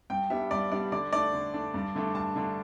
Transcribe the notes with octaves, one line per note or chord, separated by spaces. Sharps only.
G2 G5
G3 B3 D4 E5
G2 D5
G3 B3 D4 D5
D3 D5
A3 D4 D5
D3
A3 D4
G2
D3 A3 D4
G2 A5
D3 A3 D4